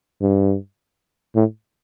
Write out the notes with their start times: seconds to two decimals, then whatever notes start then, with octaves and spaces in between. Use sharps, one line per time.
0.21 G2
1.35 A2